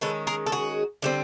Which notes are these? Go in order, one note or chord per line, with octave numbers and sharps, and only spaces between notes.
D#3 G#3 C#4 A4 B4
G#4 A#4
A4
F#4 G#4
D3 G3 C4